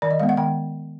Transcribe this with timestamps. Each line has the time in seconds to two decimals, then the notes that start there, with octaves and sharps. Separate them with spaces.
0.02 D#3 D5
0.11 D#5
0.20 G#3 B3 F5
0.29 F#5
0.37 D#3 G5